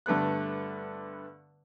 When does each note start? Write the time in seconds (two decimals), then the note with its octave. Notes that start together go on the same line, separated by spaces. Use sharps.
0.06 G2 D3 A3 B3 F#6